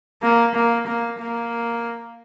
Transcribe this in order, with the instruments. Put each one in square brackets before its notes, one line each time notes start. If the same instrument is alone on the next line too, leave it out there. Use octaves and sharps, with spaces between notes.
[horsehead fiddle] A#3
A#3
A#3
A#3